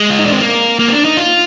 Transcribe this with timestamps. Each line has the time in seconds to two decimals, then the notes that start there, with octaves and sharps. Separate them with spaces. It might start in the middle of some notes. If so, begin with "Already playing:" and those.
Already playing: G#3
0.10 F4
0.18 D#4
0.25 D4
0.33 C4
0.41 A#3
0.79 A#3
0.88 C4
0.92 D4
1.04 D#4
1.17 F4